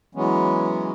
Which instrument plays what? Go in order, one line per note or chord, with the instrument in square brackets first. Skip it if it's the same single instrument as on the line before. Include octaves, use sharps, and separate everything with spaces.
[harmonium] E3 F#3 G#3 B3 C#4